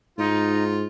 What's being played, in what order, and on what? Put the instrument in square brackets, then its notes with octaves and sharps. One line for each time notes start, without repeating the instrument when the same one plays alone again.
[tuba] G#2 [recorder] D#4 [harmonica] F4